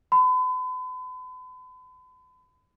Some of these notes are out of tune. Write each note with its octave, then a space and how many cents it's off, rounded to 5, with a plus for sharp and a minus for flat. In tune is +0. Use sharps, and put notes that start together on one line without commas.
B5 +40